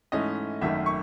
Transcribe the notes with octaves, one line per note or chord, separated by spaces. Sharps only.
G#2 E3 A3 C#4 D#5
G#1 F#2 D#3 A3 E5
C#6